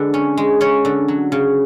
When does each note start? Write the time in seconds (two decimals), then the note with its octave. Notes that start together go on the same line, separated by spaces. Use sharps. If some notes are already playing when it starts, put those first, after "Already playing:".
Already playing: D3 G#3 B4
0.14 C#4
0.37 G#3
0.61 C#4 C#5
0.85 D3
1.08 F#3
1.32 C#3